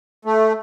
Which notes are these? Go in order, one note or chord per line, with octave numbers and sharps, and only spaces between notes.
A3